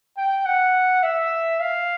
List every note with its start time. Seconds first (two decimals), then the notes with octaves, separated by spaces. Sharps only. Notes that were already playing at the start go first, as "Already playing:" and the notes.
0.17 G5
0.45 F#5
1.03 E5
1.60 F5